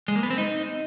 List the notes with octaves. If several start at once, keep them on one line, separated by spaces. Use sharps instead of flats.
G#3
A#3
B3
C4
D#4